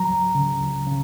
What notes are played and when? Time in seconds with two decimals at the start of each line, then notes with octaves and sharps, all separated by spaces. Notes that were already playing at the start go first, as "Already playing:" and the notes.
Already playing: F#3 A#5
0.09 C#2
0.35 C#3
0.61 C#2
0.87 C#3